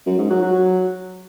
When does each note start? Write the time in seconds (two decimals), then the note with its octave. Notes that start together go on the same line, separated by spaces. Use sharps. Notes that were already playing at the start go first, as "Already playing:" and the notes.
0.06 F#2
0.18 G#2
0.30 F#3
0.42 F#3